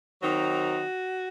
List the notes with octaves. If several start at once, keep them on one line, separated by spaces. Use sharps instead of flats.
D#3 F#3 C4 D#4 F#4